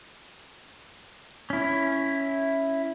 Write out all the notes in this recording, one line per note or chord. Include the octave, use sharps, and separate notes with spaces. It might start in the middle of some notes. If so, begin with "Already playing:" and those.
C#4 E4